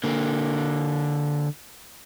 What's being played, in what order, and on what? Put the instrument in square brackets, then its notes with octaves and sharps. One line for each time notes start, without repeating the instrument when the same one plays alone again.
[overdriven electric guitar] D3 A#3